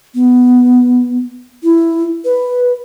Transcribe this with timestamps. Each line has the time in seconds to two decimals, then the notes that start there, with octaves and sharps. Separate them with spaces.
0.15 B3
1.63 E4
2.25 B4